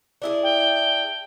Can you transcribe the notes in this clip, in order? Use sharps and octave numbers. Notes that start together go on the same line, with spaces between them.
D4 E4 G#4
G5